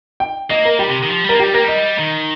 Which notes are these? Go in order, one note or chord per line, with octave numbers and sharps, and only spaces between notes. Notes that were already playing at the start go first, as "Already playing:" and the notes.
G5
A#3 D#5
A#4
G3 G4
C3
D#3
F3
G3
A#4
A#3
G3 G4
A#3 A#4
G3 D#5
D#3